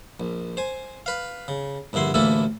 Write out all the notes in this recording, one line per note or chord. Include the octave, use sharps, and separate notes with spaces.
A#1
C5 G#5
B4 F5
C#3
A#1 G2 D3 E4 C6
A1 D2 E3 A#3 E4 A4